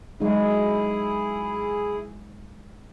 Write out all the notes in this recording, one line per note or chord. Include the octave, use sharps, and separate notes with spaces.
F#3 G#3 D#4 E4 G#4